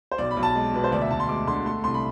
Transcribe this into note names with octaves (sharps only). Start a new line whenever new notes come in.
C5
B1 D5
B5
B1
A5
G#3
B2 B4
C5
D2 D5
E5
D2 A5
C6
G#3 D6
D3 C6
A3 C6
C2 C6
B5